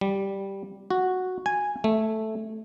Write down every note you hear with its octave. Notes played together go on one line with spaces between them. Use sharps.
G3
F#4
G#5
A3